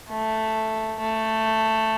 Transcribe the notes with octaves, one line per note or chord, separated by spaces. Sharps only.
A3
A3